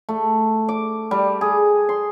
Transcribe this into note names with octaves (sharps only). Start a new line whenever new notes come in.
A3
D6
G3
G#4
C6